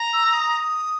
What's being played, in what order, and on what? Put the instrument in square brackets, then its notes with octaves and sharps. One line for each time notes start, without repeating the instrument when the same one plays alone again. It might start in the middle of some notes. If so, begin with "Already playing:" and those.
Already playing: [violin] A#5
[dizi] E6
D#6